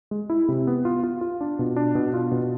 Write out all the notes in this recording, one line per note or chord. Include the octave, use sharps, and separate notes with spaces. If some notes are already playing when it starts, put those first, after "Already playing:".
G#3
E4
C3
B3
F4
F4
F4
D4
B2
D4
B2
F4
B2